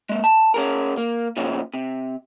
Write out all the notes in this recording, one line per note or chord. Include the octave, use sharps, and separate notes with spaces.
G#3 A#3
A5
C#4 G#4 A#4
A#3
A#2 C#3 F3 C#4
C3